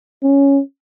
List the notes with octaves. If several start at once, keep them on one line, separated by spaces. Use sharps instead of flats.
C#4